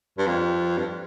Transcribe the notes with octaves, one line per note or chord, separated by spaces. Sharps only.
G2
F2
G2